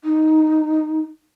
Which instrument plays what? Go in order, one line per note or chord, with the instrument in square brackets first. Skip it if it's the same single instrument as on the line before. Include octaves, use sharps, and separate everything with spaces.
[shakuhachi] D#4